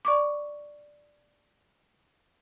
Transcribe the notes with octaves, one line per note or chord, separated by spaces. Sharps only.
D5 C#6 D6